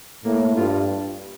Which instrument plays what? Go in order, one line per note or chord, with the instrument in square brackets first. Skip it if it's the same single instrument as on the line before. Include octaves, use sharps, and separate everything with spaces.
[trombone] A2 [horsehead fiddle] A#3
[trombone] G2 [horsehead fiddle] F4